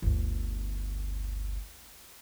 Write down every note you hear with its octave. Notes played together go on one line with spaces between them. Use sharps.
G1 D2